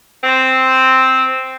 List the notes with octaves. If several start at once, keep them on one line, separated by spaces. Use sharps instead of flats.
C4